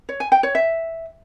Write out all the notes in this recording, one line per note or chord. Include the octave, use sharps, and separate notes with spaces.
C#5
G#5
G5
C#5
E5